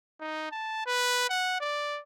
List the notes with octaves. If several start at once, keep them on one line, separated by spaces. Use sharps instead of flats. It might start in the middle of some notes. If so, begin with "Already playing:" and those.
D#4
A5
B4
F#5
D5